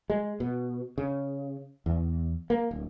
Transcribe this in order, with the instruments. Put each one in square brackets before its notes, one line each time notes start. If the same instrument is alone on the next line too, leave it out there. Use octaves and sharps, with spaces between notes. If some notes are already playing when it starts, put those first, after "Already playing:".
[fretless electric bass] G#3
B2
C#3
E2
A#3
D1